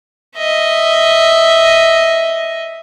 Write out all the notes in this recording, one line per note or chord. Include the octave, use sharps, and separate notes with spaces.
D#5 E5